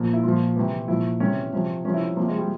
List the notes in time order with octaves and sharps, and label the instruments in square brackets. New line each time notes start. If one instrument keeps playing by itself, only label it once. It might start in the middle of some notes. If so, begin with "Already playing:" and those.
Already playing: [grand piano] A#2 F3
E4
A#2 F3 F4
C3 E3
A#2 F3 E4
C3 E3 C#4
C3 F3
C3 F3 C#4
E4
C#4
C3 F3 A#3
G#3
G3